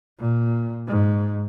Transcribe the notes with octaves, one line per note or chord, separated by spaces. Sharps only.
A#2
G#2